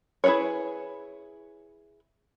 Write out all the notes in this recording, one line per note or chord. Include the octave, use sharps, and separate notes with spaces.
E4 G#4 A#4 B4 C#5